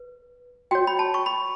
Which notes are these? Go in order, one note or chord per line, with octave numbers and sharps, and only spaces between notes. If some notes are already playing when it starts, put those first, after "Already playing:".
Already playing: B4
F#4 C#5 G5
B5
A5
C#6
B5